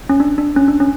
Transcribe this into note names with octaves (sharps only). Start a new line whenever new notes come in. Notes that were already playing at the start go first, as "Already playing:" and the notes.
C#4
D4
D4
C#4
D4
C#4